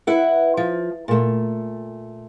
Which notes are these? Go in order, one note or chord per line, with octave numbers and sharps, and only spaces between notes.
E4 B4 F#5
F3
A#2 A3